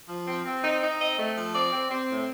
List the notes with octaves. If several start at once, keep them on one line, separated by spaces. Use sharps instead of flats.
F3
C4
C4
D#4
D#4
C4 D#5
A3
F3
C4 D5
C4
C4
A2